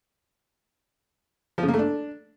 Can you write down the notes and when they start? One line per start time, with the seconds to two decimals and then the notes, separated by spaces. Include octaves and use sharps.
1.58 F3
1.63 C#3
1.68 A#3
1.74 A3
1.79 D4